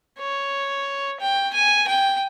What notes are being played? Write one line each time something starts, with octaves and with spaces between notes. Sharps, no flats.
C#5
G5
G#5
G5